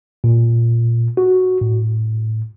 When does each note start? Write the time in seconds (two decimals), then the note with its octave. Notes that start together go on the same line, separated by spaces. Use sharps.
0.24 A#2
1.17 F#4
1.61 A2